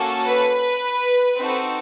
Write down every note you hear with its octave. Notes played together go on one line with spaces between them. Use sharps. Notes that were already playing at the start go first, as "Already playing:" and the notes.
Already playing: A#3 C#4 F#4 A4
B4
C4 D#4 F#4 A4